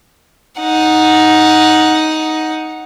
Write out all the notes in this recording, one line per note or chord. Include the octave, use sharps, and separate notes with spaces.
D#4 F#5